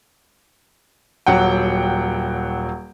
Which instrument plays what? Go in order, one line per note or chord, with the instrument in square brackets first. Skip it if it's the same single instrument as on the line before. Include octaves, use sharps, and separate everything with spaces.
[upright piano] D#1 F#3 F#5 G5